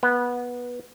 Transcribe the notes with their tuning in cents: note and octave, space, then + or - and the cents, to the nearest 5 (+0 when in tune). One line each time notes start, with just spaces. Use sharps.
B3 -15